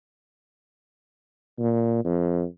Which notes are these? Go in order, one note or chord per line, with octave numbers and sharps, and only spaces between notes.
A#2
F2